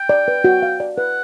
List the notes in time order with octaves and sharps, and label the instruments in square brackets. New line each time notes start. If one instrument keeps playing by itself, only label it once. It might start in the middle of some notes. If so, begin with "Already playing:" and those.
Already playing: [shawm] G5
[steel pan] D5
B4
F#4
F5
D5
[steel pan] B4 [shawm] F#5